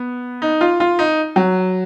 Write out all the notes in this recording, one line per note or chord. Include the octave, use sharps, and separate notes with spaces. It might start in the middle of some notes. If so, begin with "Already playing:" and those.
Already playing: B3
D#4
F4
F4
D#4
F#3